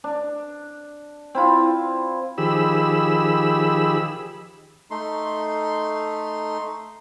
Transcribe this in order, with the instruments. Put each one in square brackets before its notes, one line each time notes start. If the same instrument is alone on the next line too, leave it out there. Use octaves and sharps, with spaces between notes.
[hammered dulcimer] D4
C4 E4 F4
[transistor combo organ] D#3 F3 G4 G#4 B5 E6
[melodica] A3 D#4 C6